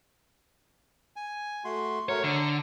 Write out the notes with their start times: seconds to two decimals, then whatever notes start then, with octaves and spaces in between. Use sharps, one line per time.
1.16 G#5
1.65 A3 F#4 C6
2.09 A3 F#4 A#4 C#5
2.24 D3 A#5